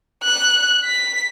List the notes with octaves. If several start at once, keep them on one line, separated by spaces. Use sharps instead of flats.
F#6
B6